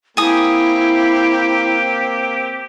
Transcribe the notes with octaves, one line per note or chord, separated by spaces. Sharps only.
A#3 C4 E4 G4 G#5 D#6